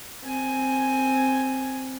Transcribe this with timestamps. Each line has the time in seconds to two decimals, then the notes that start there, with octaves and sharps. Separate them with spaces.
0.23 C4 G#5